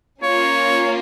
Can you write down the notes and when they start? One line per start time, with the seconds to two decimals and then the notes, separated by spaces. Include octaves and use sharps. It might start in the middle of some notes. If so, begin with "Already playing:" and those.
0.23 A#3 C#4 F4 C#5